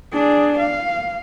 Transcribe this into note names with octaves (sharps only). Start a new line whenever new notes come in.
D4 G#4
F5